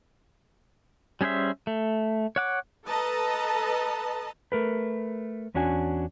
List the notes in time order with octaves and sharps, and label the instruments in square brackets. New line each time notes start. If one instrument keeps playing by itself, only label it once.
[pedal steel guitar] G3 C#4 G#4 C5 E5
A3
C#5 F#5 D6
[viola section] A4 B4 D#5 A5 A#5
[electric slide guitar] A3 A#4 B4
E2 C#4 D4 F#4 G#5